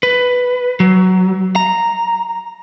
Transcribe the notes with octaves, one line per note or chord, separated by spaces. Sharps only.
B4
F#3
A#5